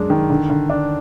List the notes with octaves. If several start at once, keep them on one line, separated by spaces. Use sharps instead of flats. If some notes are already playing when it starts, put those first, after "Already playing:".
Already playing: F#2 G#3 D4
D#3
D3
D3
D4